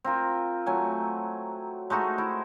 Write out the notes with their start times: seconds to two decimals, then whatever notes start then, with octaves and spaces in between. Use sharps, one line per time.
0.04 C4 F4 A#4
0.66 F#3 A3 G#5
1.90 G#3 A3 D#4 F#4
2.18 E4